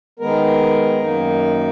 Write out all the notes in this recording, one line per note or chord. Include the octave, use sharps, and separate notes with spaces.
D#3 G#3 B3 A#4
F#2 D#3 A#3 D#4